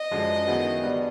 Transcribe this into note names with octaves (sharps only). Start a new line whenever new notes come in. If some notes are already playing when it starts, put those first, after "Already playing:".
Already playing: D#5
F#2 D3 F3 G#3
D#3 F#3 B3 E4 G#4
D3 G3 B3 D4